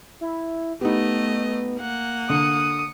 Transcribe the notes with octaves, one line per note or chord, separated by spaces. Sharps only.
E4
A3 B3 D#4 G4 D#5
A#3 F#5
D3 D#6 C#7